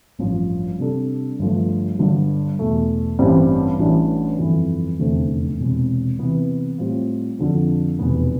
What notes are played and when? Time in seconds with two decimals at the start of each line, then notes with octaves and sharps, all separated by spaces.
0.19 A1 G2 F3
0.79 C3 G3 D4 A4
1.39 G1 G2 F3 A3
1.99 G1 G2 D3
2.59 E2 B2 A3
3.19 A1 G2 E3 G3 C4
3.79 A1 A2 E3 G3 D4
4.39 G1 F2 E3
4.99 F1 E2 D3 A3 C4
5.59 E1 E2 C3
6.19 C3 E3 B3
6.78 A2 G3 C4 F4
7.39 F2 D3 F3
7.99 F1 E2 B2 B3